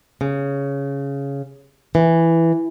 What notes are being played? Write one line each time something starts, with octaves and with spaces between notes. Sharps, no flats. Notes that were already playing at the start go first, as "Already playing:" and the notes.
C#3
E3